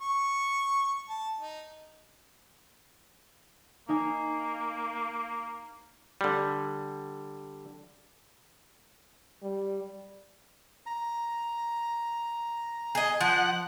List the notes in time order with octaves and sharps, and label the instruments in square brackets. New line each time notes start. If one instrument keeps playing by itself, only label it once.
[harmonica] C#6
A5
D#4
[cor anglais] A#3 [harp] D#4 D#5 G#5
[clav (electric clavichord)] D3 G3
[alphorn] G3
[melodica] A#5
[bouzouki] G#4 D#5
[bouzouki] F3 [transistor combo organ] F#5